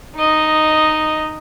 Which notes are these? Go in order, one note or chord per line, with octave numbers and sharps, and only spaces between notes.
D#4 D#5